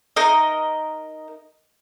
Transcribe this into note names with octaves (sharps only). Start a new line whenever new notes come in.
D#4 A#4 D#5